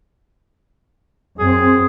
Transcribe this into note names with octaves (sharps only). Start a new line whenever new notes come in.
F#2 C4 G#4